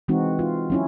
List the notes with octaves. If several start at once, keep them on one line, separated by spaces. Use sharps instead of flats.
E3 G#3 C4 D#4 F#4
F4
F#3 C#4 E4